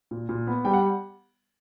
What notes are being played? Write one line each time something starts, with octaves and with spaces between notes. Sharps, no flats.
A#2
A#2
B3
G3 G5
F#5